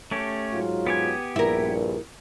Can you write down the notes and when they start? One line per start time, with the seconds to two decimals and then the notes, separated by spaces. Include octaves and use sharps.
0.11 A3 C#4 G4
0.54 G#2 F#3 F4
0.87 B3 G4 G#5
1.36 A#1 G2 E4 A#4